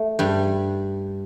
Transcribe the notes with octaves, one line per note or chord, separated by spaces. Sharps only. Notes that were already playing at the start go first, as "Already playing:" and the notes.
Already playing: A3
G2 G3